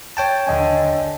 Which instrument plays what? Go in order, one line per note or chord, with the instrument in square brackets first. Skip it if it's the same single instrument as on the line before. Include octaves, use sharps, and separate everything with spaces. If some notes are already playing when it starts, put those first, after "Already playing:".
[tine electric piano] C#5 G5 A5
[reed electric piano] D#2 D#5 G#5 [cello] D3